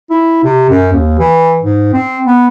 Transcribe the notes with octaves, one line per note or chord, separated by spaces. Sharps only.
E4
C3
F#2
D#2
E3
G#2
C4
B3